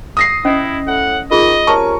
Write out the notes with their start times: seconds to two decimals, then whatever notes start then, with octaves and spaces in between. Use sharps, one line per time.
0.17 D#6 A#6 C7
0.45 C#4 E4 C5 D#5
0.87 A2 F#5
1.31 D#3 F4 G#4 D#5
1.67 C3 C#4 A#4 A5 C#6